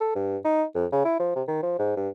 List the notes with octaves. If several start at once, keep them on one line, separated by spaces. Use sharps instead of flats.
A4
G2
D#4
F2
C#3
E4
F3
C3
D#3
F3
G#2
G2